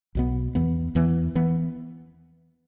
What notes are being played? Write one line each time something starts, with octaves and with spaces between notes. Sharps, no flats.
B1 B2 B3
E2 E3 B3
E2 E3 B3
E3 B3